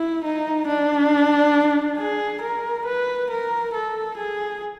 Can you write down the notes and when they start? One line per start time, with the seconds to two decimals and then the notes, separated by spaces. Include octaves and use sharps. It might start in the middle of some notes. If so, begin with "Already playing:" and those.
Already playing: E4
0.24 D#4
0.68 D4
1.98 G#4
2.42 A#4
2.85 B4
3.30 A#4
3.74 A4
4.17 G#4